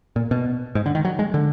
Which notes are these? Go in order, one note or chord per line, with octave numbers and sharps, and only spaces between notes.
A#2
B2
G#2
D3
D#3
F#3
G#3
D3